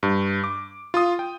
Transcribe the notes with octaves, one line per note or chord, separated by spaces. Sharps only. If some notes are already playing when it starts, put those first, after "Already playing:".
G2
D6
F4 C6 D#6
G5